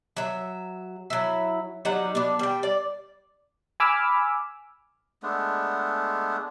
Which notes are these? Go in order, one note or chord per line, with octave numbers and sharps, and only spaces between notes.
F#3 E5
F#3 E4
F#3 G3 D#4 F#5
B3 D4
G3 G5
D5
G#5 B5 D6 E6 F6
G#3 A3 B3 D4